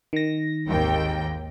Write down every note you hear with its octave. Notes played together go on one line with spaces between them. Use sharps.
D#3 A#6
G#1 D#2 G5